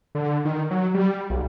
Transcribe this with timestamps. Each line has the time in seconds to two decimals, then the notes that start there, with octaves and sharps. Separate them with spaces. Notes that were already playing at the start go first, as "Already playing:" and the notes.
0.15 D3
0.45 D#3
0.71 F#3
0.94 G3
1.30 B1